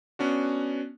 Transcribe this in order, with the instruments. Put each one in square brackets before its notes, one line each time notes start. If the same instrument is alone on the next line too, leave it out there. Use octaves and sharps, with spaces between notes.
[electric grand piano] B3 C#4 D4 F#4